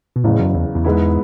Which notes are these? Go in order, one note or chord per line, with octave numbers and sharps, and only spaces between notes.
B2
F#1 E2 A2 C#3
F#2
E2
E2
G#2 G#3 B3 E4